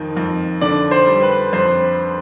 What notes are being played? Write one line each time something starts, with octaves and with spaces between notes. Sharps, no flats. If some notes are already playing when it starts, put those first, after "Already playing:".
Already playing: F2 D#3
F2
D3 D5
C5
G3
B4
F2 C5